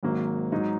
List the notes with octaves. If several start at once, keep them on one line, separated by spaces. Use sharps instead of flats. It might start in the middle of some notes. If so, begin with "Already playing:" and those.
G#1 G#2 F#3 A#3
G#2 F#3 D#4